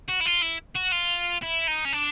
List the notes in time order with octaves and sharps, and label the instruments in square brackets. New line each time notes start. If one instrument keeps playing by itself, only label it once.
[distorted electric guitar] F#4
E4
F4
E4
F#4
F4
E4
D#4
C#4
D4